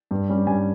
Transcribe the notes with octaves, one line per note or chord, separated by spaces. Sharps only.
G2
G3 C#4
G2 G#5